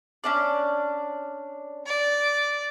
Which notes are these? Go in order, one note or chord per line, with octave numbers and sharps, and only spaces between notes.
C#4 D4 D5
D5